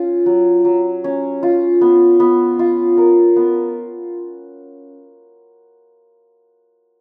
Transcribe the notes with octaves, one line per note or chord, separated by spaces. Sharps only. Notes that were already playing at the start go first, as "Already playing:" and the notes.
Already playing: C#4 F4
F#3
F#3
C#4
F4
B3
B3
F4
A#4
B3